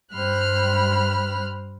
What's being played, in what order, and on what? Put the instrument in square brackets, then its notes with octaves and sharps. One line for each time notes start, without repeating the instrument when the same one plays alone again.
[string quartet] G2 G3 C5 B5 F6 F#6